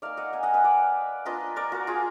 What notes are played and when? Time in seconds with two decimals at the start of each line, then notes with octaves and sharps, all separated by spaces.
0.02 A#3 D#4 D5 F5
0.17 D#5 F#5
0.33 F5 G#5
0.43 D#5 F#5
0.54 B4 D#5
0.64 D5 F5
1.25 A#3 D4 F4 B4 D#5
1.56 A#4 D5
1.72 F#4 A#4
1.87 F4 G#4